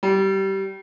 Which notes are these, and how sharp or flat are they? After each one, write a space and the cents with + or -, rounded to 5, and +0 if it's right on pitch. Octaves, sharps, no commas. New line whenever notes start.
G3 -20